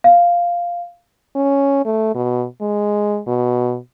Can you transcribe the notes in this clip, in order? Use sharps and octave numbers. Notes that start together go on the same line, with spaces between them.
F5
C#4
A3
B2
G#3
B2